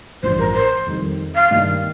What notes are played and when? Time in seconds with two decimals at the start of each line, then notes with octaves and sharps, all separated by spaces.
0.23 A1 G2 F3 C5
0.39 A#4
0.54 C5
0.86 F2 D#3 G3
1.35 F5
1.51 G2 D#3 A#3 D#4